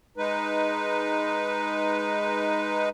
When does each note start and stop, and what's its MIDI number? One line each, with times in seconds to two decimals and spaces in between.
0.17 2.89 56
0.17 2.89 63
0.17 2.89 71